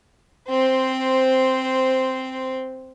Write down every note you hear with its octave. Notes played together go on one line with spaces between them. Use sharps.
C4 C5